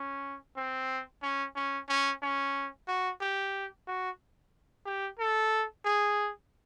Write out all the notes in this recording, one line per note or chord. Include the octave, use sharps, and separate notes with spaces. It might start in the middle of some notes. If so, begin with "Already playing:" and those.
Already playing: C#4
C4
C#4
C#4
C#4
C#4
F#4
G4
F#4
G4
A4
G#4